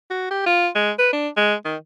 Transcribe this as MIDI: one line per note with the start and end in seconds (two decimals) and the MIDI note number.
0.10 0.29 66
0.31 0.43 67
0.46 0.68 65
0.75 0.92 56
0.99 1.09 71
1.13 1.28 62
1.37 1.55 56
1.65 1.77 51